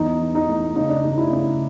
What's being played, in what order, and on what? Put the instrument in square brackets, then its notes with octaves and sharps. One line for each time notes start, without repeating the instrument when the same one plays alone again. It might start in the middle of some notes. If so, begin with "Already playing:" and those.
Already playing: [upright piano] E2 D#4
E3
D#4
A3
C#3 D#4
D4
A3 D#4
E4
C#3